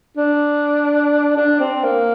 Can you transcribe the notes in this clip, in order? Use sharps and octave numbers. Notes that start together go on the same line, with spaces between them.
D4
D4
C4
A#3